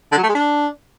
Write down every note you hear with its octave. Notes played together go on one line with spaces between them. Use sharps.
D3
F#3
A3
G#3
D4